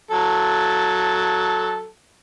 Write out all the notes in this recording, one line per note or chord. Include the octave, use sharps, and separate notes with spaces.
F#3 A4 A5